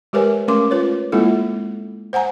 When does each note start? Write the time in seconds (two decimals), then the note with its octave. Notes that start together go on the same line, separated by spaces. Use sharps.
0.13 G#3 G4 A#4 B4 C#5 G#5
0.48 A3 C#4 A#4 C6 D6
0.71 F4 B4 C#5
1.12 G#3 A#3 C4 E4 F4 A4
2.13 C5 F#5 G#5 A#5